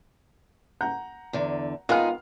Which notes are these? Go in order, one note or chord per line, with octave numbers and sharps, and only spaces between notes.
F#5 A#5 G6
E2 D3
D#3 G#3 B3 D#4 F4 G#4 F5 F6